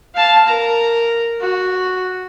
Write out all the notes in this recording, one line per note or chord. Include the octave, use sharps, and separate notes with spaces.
F5 A5
A#4 A#5
F#4